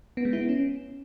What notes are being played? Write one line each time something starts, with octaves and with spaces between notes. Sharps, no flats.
B3
G#3
E4
B3
C#4